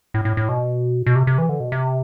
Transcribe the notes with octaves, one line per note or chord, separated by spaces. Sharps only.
A2
A2
A2
B2
B2
C3
C3
E3
D3
B2
C3